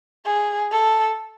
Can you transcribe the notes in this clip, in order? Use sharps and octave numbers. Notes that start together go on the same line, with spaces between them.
G#4
A4